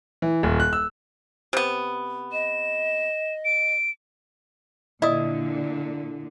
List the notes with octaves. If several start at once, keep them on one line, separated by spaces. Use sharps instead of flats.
E3
D#1
F#6
E6
C3 B3
D#5 E7
D7
A#2 D3 E4 D5 D#5 D#6